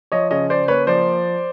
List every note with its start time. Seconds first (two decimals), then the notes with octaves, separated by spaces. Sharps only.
0.12 F3 C#5 D#5
0.31 C#3 C#5 D#5
0.50 C#3 C5 D5
0.68 A#3 B4 C#5
0.87 F3 C5 D5